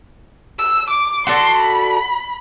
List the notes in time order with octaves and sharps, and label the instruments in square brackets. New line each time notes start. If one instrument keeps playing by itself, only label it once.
[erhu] E6
D6
[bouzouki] F#4 A4 D5 [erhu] C6
[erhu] B5